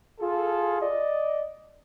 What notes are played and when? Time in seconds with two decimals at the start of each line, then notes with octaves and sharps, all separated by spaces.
0.20 F4 G#4 A4
0.82 D5 D#5